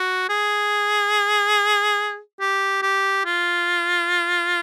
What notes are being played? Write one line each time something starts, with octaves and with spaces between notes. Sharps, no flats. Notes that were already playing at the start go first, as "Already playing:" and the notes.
Already playing: F#4
G#4
G4
G4
F4